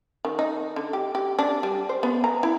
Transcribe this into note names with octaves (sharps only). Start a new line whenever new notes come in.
D#3
D#4
D3
G4
G4
D4
G3
C5
B3
A#5
E4